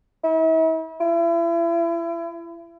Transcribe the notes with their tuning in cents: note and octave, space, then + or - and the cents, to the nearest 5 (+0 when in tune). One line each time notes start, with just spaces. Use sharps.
E4 -40
E4 +35